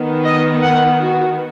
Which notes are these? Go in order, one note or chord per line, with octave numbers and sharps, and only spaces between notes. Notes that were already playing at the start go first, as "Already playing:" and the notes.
Already playing: D#3 B3
D#5
F#5
F#4